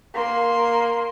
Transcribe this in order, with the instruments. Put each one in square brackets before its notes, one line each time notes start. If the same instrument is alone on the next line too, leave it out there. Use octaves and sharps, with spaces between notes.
[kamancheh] A#3 C6